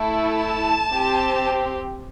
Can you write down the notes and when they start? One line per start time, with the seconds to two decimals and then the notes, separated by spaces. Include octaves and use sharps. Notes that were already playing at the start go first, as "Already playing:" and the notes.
Already playing: A3 E4 A4
0.41 A5
0.91 C4 G4